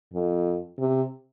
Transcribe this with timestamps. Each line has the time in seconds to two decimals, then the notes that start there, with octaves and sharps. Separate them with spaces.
0.14 F2
0.79 C3